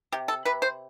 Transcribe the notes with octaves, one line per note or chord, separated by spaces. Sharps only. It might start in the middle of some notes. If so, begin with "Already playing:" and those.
C3 G4
A4
C3 B4
C5